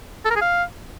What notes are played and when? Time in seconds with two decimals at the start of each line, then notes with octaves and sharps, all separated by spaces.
0.25 A4
0.30 A#4
0.36 G#4
0.42 F5